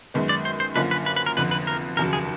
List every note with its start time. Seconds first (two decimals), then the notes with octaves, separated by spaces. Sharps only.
0.14 F#2 D#3 G#3 B3
0.29 D5
0.45 C5
0.60 C5
0.75 F#2 D3 F3 A#3 C#4 B4
0.91 B4
1.06 B4
1.16 B4
1.26 A#4
1.37 F1 F2 D3 B4
1.51 B4
1.67 A#4
1.97 F1 D#2 C#3 F#3 A#4
2.13 G#4